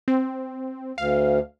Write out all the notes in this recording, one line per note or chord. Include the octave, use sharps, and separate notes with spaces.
C4
D2 F5